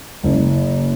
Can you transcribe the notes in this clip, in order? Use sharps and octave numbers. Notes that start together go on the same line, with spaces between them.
F#1